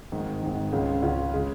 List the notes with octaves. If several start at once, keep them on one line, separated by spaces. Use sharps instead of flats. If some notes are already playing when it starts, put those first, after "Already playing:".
G#1 G#2 D#3
G#1 G#2 D#3
C#2 C#3 G#3 C#4 F4
C#2 C#3 G#3 C#4 F4
C#3 G#3